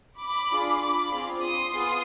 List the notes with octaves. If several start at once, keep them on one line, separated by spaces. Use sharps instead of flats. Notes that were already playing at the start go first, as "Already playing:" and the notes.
B5 D6
D4 F4 G#4
B5 D6
C4 F4 G#4
C6 D#6
B3 F4 G#4